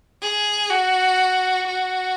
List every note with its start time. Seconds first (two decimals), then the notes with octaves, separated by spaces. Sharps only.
0.22 G#4
0.70 F#4
1.67 F#4